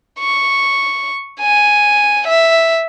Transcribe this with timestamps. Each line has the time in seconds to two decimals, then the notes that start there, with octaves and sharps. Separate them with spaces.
0.19 C#6
1.40 G#5
2.27 E5